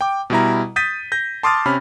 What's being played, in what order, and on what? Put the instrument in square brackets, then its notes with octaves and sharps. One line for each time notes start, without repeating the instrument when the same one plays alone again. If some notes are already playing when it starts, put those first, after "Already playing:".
[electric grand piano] G5 D6
B2 G3 E4 A#5
D#6 G6 A6 B6 D#7
G6 A#6
A5 C6 D6 D#6 F6 A6
C3 C#4 B5 F6